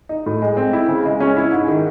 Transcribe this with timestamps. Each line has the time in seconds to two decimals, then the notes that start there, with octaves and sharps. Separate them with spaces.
0.09 D#4
0.26 A2
0.42 G#3
0.57 C4
0.73 E4
0.88 C#3
1.05 G#3
1.20 C#4
1.36 E4
1.52 G#2
1.68 D#3